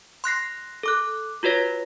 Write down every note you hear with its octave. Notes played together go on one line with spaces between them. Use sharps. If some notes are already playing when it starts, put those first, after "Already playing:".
C6 F#6 A#6 C7
A4 D6 F#6
F4 F#4 B4 C#5 A#6